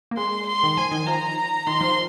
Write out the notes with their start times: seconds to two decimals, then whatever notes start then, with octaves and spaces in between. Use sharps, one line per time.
0.11 A#3
0.17 G#3 C6
0.47 C6
0.63 D#3
0.77 F3 G#5
0.91 D#3
1.07 F3 A#5
1.67 D#3 C6
1.81 F3